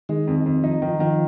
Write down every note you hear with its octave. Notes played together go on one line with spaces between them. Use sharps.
D#3 G#3
F2
F2
F3 D#4
D#3 F3
D#3 F3